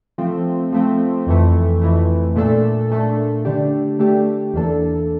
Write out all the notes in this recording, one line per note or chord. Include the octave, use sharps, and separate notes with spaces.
F3 A3 C4
F3 A3 C4
F2 E3 A3
F2 E3 A3
A#2 A3 D4 A4
A#2 A3 D4 A4
D3 A3 D4 G4
D3 A3 D4 G4
E2 E3 A#3 D4 A4